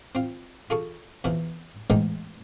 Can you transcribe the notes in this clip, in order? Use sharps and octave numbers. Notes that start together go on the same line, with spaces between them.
C4 F4
F4 G#4 A4 C#6
E2 B2 E3 F3
A1 E2 G#2 G#3 D#4 G5